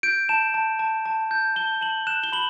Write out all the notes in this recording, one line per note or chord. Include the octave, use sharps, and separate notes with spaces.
G6 D7
A5 E7
A5
A5
A5
G6
A5 G7
A5 F#7
F#6 E7
G7
B5 F#7